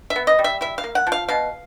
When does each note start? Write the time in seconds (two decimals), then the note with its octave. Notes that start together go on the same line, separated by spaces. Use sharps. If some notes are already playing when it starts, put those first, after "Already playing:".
0.10 E5
0.16 B3
0.27 D#5
0.39 G3
0.44 E5
0.61 E4 E5
0.78 F5
0.84 A#3
0.95 F#5
1.07 F3
1.12 F5
1.28 B2 F5